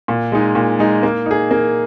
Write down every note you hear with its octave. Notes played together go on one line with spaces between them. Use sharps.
A#2
G#3 D#4
A#2
G#3 D#4
A#3
D#4 G#4
A#3